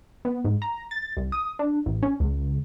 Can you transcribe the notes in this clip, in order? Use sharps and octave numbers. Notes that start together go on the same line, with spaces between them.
B3
G#2
A#5
A6
C2
D#6
D4
A1
C#4
C#2